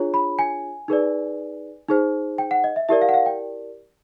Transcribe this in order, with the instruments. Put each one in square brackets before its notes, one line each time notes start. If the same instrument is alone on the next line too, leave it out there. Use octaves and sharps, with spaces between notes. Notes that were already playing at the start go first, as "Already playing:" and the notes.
Already playing: [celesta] D4 F4 G#4 C#5
B5
G#5
D#4 G#4 B4 D5
D#4 G#4 C5
G5
F#5
D#5
E5
E4 G4 A#4 D5 E5
F5
F#5
F5
G5